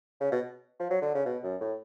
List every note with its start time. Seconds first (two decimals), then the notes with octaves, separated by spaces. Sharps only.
0.20 C#3
0.32 B2
0.79 F3
0.90 F#3
1.02 D3
1.15 C#3
1.25 B2
1.43 F#2
1.61 A2